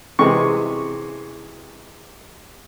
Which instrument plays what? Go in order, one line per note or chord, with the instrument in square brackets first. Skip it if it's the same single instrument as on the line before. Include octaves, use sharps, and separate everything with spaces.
[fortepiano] C3 E3 G#3 C#6